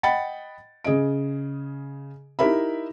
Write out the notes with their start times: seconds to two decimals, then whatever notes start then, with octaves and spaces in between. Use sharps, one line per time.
0.03 D#5 F#5 G5 B5 A6 C#7
0.84 C#3 G#4 D#5 D7
2.39 D#4 E4 G4 A#4 E5 B5